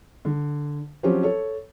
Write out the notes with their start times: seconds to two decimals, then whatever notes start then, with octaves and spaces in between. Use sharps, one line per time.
0.25 D3
1.03 F3 F#3 C4 C#4 G4
1.23 A4 C#5